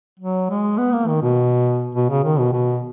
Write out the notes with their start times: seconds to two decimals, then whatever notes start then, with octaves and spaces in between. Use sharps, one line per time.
0.19 F#3
0.50 G#3
0.78 B3
0.93 A#3
1.08 D#3
1.22 B2
1.95 B2
2.10 C#3
2.24 D#3
2.39 B2
2.53 B2